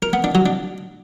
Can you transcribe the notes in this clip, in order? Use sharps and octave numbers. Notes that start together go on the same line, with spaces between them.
A#4
B3
D4
F#3
D4